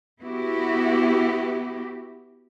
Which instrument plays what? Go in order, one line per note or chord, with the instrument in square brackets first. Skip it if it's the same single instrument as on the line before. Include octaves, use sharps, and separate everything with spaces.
[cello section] B3 E4 F#4 G4